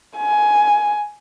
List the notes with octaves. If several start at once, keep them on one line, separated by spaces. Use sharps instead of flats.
G#5